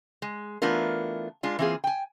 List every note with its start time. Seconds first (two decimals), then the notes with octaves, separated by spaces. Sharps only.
0.22 G#3
0.62 E3 A3 B3 D4 F4 A#4
1.43 G#3 D4 F4
1.59 E3 A#3 C4 F4 G#4
1.84 G5 G#5